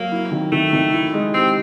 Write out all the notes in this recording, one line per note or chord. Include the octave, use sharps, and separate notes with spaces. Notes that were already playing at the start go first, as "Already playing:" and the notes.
Already playing: F#3 A#3
E4
D#3
D#3 A3
D#3
E4
G#3
C4 G4